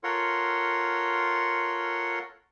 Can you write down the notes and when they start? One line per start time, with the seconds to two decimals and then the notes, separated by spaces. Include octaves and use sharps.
0.04 F4 A4 A#4 C#5 F#5 C6